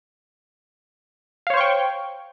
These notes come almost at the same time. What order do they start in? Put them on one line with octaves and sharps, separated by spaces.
F5 C#5 C5 C#6 G5